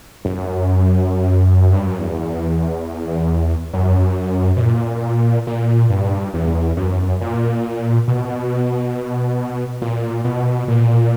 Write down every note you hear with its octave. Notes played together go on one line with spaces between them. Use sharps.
F#2
G2
F#2
E2
F#2
B2
A#2
A#2
G2
E2
F#2
A#2
B2
A#2
B2
A#2